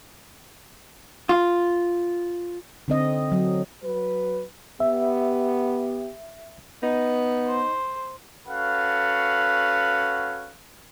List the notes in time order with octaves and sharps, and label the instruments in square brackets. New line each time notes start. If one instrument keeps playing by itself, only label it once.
[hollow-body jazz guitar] F4
[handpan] D3 C4 D#5
F#3
[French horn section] F#3 B4
[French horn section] B3 G4 [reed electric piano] E5
[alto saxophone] B3 [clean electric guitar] D#4
[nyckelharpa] C5
[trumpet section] C#4 F#4 A4 B4 F5 F#5